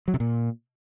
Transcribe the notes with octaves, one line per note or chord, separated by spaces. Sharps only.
F#3
C3
A#2